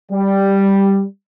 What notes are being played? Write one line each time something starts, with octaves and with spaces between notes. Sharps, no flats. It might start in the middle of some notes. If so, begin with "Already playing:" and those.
G3